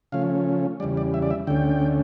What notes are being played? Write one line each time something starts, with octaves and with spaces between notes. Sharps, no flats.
C#3 F3 A3 C#4 F5
E2 C#3 G3 D5
D5
E5
D5
E5
D2 D3 A3 C#4 G5